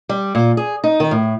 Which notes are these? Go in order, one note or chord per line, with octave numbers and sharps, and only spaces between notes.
G3
A#2
G#4
D#4
D#3
A2